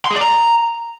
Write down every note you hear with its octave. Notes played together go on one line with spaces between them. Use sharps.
C6
G#4
D5
A#5